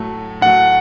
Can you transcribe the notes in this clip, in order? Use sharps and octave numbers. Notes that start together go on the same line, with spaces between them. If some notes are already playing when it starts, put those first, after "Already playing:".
Already playing: A2 F#3 A3
A2 F#3 A3 F#5